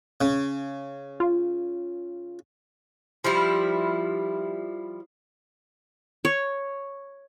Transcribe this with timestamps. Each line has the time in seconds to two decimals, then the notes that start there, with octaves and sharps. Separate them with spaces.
0.21 C#3
1.20 F4
3.24 F3 G3 E4
6.25 C#5